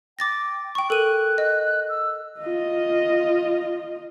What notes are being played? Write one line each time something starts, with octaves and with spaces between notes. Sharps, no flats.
G5 D6 A6 A#6
G5 C#6
A4 A#4 F#6 D#7
D#5
E6
F4 D#5